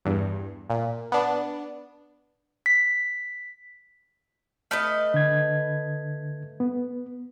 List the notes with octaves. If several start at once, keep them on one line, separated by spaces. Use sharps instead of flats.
E2 G2
A#2
B3 D4
B6
A3 B4 D#5 F6
D3 G#6
B3